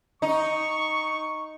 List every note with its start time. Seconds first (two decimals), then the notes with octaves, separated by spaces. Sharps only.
0.22 D#4 C#6